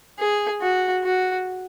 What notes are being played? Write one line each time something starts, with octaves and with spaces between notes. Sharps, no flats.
G#4
F#4
F#4